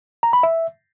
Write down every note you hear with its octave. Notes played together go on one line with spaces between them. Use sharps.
A#5
B5
E5